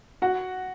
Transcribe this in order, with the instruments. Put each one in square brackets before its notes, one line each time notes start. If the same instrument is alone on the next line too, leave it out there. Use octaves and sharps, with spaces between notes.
[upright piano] F#4 F#5